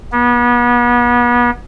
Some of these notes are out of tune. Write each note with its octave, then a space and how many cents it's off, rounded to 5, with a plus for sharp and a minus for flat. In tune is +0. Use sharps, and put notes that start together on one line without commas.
B3 -35